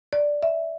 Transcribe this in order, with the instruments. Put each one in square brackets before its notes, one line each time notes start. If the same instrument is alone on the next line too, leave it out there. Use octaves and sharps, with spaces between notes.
[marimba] D5
E5